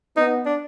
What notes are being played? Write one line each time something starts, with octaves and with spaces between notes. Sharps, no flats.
B3 D#4
D4